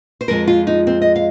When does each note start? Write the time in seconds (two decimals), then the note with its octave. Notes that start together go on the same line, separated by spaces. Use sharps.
0.21 C5
0.28 F2 F3 G#3 A#4
0.47 F4
0.67 D#4
0.87 C4
1.02 D#5
1.16 F5